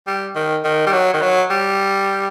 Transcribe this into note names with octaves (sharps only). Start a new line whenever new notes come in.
G3
D#3
D#3
G3
F#3
D#3
F#3
G3